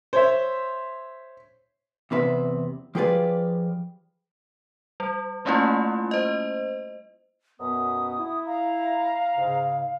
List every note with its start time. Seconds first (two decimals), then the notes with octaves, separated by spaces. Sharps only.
0.13 C5 C#5 E5
2.11 E2 C3 B4 E5
2.95 F3 F4 G4 G#4 B4 D5
5.00 G3
5.45 G3 A3 A#3 C#4 E4 F4
6.11 C5 D#5
7.60 F#2 B2 B3 D#6
8.19 E4
8.46 F5 A#5
9.37 G#2 C#3